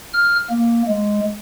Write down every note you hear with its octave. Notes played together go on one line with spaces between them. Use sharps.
F6
A#3
G#3